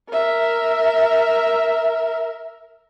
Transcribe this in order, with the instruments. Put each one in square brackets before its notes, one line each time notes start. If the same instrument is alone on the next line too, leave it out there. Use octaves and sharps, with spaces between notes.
[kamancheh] A#4 E5